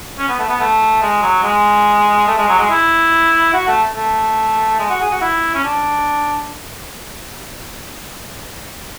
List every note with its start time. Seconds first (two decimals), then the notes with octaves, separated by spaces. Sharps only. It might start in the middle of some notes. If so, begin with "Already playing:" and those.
0.18 C#4
0.29 B3
0.39 A3
0.49 B3
0.60 A3
1.02 G#3
1.22 F#3
1.43 G#3
2.27 A3
2.38 G#3
2.49 F#3
2.59 G#3
2.70 E4
3.53 F#4
3.67 A3
3.95 A3
4.80 G#3
4.90 F#4
5.01 G#4
5.11 F#4
5.21 E4
5.54 C#4
5.63 D4